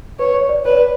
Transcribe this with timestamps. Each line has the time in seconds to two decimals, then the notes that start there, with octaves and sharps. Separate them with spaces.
0.19 B4 C#5
0.34 C#5
0.49 D5
0.65 B4 C#5
0.75 D5